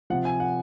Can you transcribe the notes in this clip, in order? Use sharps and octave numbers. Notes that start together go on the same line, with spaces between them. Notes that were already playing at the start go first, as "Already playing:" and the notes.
C3 F3 F#5
G#5
F#5